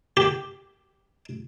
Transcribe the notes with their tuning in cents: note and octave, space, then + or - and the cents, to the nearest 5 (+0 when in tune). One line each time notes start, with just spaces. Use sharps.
G4 +0